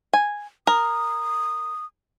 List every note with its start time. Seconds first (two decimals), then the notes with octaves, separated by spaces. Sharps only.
0.13 G#5
0.67 A#4 D#6